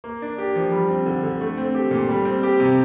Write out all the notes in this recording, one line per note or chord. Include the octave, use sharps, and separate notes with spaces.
A#3
D4
G4
F3
G3
C4
D3
D3
A3
C4
G4
A#2
G3
C4
G4
C3